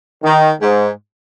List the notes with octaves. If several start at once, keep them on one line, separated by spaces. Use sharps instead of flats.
D#3
G#2